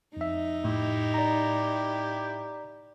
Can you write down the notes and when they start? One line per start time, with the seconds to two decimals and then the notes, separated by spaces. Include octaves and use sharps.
0.17 F2 D#4 E5
0.64 A2 E4 G4
1.14 D5 A#5